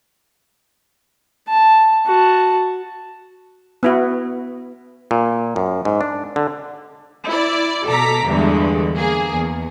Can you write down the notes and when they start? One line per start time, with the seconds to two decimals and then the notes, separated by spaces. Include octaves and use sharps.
1.49 A5
2.06 F#4 A5
3.83 B3 E4 F#4
5.11 A#2
5.56 F#2
5.85 G#2
6.01 D4
6.36 D3
7.27 E4 D5
7.87 B2 A4 A#5 D6 B6
8.26 E2 G2 D3 E3 G#3
8.95 A#3 G#4
9.35 E2